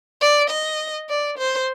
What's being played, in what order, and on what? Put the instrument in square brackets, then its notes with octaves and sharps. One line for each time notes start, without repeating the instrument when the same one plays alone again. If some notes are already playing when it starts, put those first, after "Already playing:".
[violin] D5
D#5
D5
C5